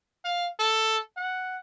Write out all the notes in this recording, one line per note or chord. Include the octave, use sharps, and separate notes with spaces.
F5
A4
F#5